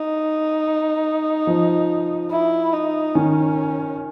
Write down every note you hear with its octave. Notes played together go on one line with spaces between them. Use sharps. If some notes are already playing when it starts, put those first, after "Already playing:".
Already playing: D#4
F3
E4
D#4
D#3 C#4